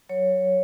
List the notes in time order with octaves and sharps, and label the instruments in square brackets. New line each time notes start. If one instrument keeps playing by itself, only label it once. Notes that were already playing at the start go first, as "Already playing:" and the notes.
[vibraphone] F#3 C#5